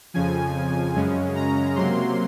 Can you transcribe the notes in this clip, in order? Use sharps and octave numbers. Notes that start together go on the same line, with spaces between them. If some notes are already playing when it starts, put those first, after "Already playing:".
F2 C#3 F3 G#5
F#2 C#3 G#3 C#4
A#5
C3 F#3 A#3 C6